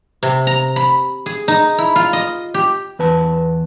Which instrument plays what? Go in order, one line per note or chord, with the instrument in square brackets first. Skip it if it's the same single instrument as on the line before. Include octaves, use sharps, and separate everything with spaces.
[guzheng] C3
A#5
B5
G#4
D#4
E4
F4
D#5
G4
[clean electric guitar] E2 B4 A5